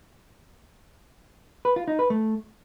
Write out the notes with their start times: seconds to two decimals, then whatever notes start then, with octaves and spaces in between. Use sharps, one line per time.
1.65 B4
1.76 F4
1.88 D#4
1.99 B4
2.10 A3